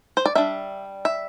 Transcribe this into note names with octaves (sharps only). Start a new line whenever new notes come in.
C5
D5
G3 D4 E5
E5